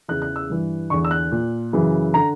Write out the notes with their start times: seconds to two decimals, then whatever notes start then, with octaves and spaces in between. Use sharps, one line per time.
0.08 E2 C#3 E3 F#6
0.22 F#6
0.36 E6
0.50 G2 E3
0.90 E2 D3 C#6
1.05 E6
1.11 F#6
1.32 A#2
1.73 F#2 C#3 E3
2.14 D3 A#5